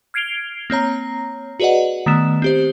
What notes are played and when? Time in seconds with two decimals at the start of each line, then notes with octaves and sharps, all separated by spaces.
0.14 F6 G#6 C7 D7 F7 G7
0.70 A#3 C4 C#5 A#5
1.60 F#4 G#4 B4 D5 D#5 F#5
2.06 D#3 A3 B3 E7
2.42 C4 G4 C5